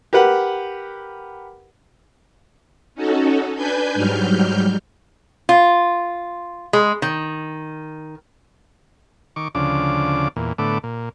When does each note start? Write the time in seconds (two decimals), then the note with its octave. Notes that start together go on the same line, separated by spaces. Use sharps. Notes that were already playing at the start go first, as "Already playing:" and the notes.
0.13 G4 A#4 B4 F#5
2.95 C#4 D#4 F#4 A4
3.56 D4 B4 G#5 G6
3.94 G#2 F#3 G3 F6 G6
5.49 F4
6.73 G#3
7.02 D#3
9.36 D#3 C#6 D6
9.55 D2 C#3 F3 D4 D6
10.36 E2 A#2
10.58 A2 D3 A3 B3 D6
10.84 A#2